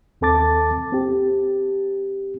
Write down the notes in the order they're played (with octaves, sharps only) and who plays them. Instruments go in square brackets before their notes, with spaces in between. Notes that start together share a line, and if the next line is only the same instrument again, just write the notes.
[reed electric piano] D#2 C4 A4 A5 D6 A6
C4 G4